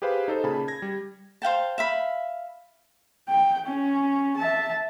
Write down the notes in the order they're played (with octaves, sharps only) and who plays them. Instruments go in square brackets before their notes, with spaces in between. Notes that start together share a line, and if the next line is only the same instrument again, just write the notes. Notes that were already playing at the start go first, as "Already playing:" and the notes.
[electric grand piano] G4 G#4 B4 C5 F5 B5
D#4 A4 C5
A#2 C#3 G#4 A5 B5
G#6 A#6
G3
[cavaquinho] C5 F5 G5 A5
E5 F5 B5
[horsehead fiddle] G5
C#4
E5 A5